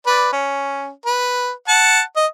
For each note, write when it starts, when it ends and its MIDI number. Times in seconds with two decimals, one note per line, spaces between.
0.07 0.28 71
0.07 0.28 74
0.33 0.90 61
1.06 1.50 71
1.68 2.01 78
1.68 2.01 81
2.16 2.26 75